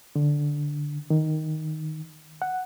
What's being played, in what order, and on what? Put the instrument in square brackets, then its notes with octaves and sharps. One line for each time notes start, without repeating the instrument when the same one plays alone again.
[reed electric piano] D3
D#3
F#5